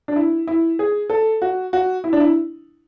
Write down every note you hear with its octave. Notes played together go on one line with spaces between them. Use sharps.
D4
E4
E4
G#4
A4
F#4
F#4
E4
D4
E4